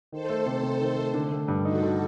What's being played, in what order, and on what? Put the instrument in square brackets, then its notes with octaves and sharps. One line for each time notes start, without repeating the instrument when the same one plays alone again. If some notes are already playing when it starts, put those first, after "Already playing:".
[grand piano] D#3 [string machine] A4 C5
[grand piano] A3
C3
C3
D#3
A3
D3
A3
G2
[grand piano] D#4 [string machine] F#4 A4
[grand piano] D3